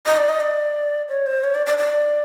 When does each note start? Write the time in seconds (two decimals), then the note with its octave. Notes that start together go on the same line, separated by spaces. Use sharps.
0.06 D#5
0.17 D5
0.29 D#5
0.40 D5
1.09 C#5
1.26 C5
1.44 C#5
1.55 D5
1.66 D5
1.78 D5